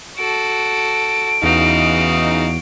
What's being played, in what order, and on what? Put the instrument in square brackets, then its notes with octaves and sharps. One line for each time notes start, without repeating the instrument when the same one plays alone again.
[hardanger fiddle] F#4 A4 [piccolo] D7
[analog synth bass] E2 [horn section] C#3 E3 D#4 [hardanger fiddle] F#4 F5